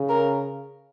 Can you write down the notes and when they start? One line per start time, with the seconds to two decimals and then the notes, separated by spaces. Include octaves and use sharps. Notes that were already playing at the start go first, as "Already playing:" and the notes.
Already playing: C#3
0.09 A#4